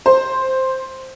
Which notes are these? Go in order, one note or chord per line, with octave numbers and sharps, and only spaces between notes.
C5